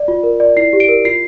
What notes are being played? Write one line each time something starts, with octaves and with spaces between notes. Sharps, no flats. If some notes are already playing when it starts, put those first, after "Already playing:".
Already playing: D5
F4
A#4
D5
E4 C7
G4
D7
A#4
F4 C7